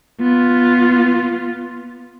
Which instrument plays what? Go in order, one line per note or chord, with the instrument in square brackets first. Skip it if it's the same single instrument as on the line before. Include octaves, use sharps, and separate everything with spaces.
[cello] B3 F4